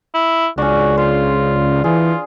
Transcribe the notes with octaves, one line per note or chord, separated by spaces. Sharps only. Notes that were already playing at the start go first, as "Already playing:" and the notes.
E4
C#2 C#3 C#4 D4 F#4
F4 C5
E3 F4 G#4